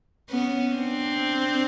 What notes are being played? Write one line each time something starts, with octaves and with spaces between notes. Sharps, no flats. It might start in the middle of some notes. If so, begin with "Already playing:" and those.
B3 C#4
C4 D4